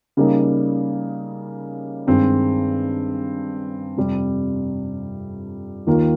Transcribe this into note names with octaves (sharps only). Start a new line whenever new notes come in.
C#3 G3 A#3 D#4
G2 D#3 G#3 C4
F2 C3 G3
D#2 D#3 A#3 F4 A#4